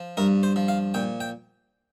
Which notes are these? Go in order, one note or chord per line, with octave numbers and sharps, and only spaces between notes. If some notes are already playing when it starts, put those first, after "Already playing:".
Already playing: F3
G2 A#4
C5
F3
F5
A#2 G5
G5